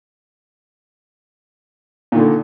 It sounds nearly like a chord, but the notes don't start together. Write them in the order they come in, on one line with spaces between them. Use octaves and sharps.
A#2 D#3 D3